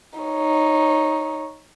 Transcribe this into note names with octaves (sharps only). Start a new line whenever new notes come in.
D#4 C#5